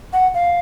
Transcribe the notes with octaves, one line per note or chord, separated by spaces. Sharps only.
F#5
F5